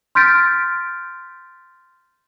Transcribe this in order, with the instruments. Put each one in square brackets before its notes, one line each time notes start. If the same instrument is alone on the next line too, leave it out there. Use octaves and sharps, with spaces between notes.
[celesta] C6 F6 G6 A6 B6 D7